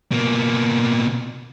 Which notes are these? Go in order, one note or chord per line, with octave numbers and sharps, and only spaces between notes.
B2 A#3